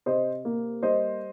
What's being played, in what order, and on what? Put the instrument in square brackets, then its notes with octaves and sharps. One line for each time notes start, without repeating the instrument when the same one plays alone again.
[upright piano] C3 C5 D#5
A#3
G3 C5 D#5